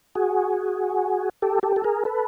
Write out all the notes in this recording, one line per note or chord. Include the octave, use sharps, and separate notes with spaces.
F#4 G#4
G4 A4
G4 A4
A4
G#4 A#4
A4 B4